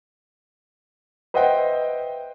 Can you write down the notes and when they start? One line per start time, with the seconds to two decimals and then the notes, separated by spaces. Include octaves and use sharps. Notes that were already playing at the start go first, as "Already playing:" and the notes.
1.34 B4 C5 D#5 E5 F#5 G5